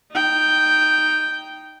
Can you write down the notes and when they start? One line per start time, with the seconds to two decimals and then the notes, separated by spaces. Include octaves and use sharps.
0.12 D#4 G5